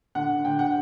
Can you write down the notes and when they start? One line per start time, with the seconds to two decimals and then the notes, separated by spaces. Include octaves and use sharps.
0.15 D3 F#5
0.45 D3 G5
0.59 F#5